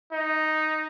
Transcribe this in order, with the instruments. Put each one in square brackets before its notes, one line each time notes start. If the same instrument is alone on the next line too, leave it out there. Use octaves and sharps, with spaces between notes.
[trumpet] D#4